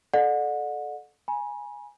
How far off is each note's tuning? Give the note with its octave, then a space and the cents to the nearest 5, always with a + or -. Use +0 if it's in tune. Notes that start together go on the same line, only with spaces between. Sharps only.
A4 -20 D5 +35 F#5 -30
G#5 +0 B5 -45